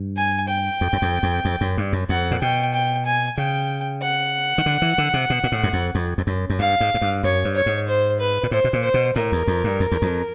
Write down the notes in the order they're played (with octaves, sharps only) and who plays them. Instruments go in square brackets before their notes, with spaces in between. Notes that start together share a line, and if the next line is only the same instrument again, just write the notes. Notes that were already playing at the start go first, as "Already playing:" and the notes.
Already playing: [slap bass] G2
[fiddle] G#5
G5
[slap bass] F2
F#2
F2
F2
F2
F#2
G2
F#2
[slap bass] F2 [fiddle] F#5
[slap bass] A#2
[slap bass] B2 [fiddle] G5
[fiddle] G5
G#5
[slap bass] C#3 [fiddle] G5
[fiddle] F#5
[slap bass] D#3
D3
E3
D3
C3
B2
A#2
A2
F#2
F2
F2
F2
F#2
F#2
[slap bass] G2 [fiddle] F5
[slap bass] G#2
G#2
G2
[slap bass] F#2 [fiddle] C#5
[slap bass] G2
[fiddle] C#5
[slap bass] G#2
[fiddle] C5
B4
[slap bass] A#2
[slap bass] A2 [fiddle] C5
[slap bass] B2
A#2
[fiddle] C5
[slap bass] B2
[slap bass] A2 [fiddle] A#4
[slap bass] E2
F2
G2
F2
E2
F2